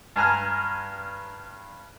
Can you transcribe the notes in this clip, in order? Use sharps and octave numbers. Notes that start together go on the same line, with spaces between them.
G2 G#5 A#5 F6